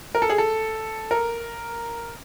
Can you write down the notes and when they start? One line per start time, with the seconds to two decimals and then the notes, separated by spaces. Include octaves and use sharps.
0.15 A#4
0.22 A4
0.30 G#4
0.38 A4
1.11 A#4